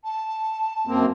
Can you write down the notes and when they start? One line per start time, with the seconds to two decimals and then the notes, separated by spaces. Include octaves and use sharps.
0.04 A5
0.87 F#2 A#3 C4